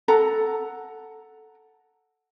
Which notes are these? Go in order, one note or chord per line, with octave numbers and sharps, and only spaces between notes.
A4 F#5 A#5